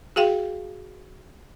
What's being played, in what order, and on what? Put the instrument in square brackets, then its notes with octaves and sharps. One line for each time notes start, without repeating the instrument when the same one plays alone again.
[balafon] F#4 G#4 F5 G5